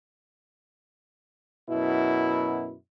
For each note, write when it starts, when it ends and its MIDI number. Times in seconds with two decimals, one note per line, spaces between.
1.69 2.74 42
1.69 2.74 47
1.69 2.74 64